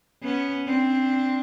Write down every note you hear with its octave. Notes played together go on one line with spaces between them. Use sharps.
B3 C#4
C4 D4